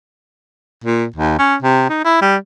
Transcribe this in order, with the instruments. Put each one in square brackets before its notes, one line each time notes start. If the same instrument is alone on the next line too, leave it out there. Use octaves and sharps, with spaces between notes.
[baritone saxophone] A#2
D#2
C#4
C3
D#4
E4
G3